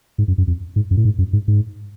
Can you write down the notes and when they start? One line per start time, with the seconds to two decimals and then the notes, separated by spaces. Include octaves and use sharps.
0.18 G#2
0.28 F#2
0.38 F#2
0.47 F2
0.76 G#2
0.91 F#2
0.97 A2
1.05 G#2
1.18 F#2
1.33 G#2
1.48 G#2